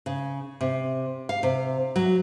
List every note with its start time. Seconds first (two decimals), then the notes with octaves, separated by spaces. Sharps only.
0.06 C#3
0.61 C3
1.29 F5
1.43 C3
1.96 F#3